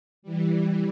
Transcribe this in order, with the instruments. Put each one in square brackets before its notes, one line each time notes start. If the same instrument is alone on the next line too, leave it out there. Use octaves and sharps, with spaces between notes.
[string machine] E3 G3